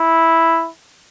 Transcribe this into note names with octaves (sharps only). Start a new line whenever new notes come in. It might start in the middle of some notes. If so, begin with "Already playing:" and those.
Already playing: E4